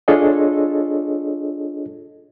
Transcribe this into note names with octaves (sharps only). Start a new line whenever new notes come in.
D4 F4 G#4 A4 C#5 D#5